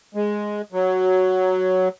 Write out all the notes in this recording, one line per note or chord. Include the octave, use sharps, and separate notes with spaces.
G#3
F#3